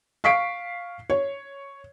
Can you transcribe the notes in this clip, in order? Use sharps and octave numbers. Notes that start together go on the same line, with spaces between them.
F5 C#6 B6 C7 D7
C#5